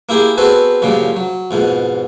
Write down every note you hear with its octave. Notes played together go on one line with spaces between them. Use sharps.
A#3 E4 G4 G#4
B3 C4 F#4 G#4 A4 B4
F#2 A#2 C#3 F3 G3
F#3
F2 G#2 B2